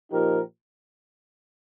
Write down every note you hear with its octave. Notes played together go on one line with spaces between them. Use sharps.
A#2 F3 D#4 G4 A#4